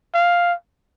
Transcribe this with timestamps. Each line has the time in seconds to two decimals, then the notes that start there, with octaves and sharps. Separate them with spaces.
0.14 F5